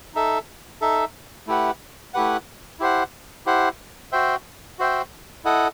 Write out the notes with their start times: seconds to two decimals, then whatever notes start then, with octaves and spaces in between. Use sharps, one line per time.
0.15 D#4 A4 E5
0.81 D#4 A4 E5
1.47 A3 E4 G4 B4 F#5
2.14 A3 E4 G4 B4 F#5
2.80 E4 G4 C5 F#5
3.46 E4 G4 C5 F#5
4.12 F#4 C5 E5 G5
4.79 F#4 C5 E5 G5
5.44 E4 A4 D#5 F#5